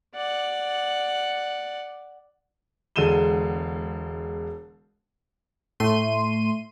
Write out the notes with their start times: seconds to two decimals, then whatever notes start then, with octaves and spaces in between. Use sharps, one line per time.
0.15 D5 F#5
2.96 E1 D3 G#3 D#7 E7 G7
5.80 A2 A3 C6 D#7